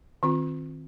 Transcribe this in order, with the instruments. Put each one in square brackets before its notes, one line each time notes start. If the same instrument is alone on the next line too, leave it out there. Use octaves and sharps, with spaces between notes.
[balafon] D#3 C4 F4